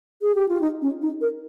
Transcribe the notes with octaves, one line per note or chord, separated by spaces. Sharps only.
G#4
G4
F4
D#4
C#4
D#4
A#4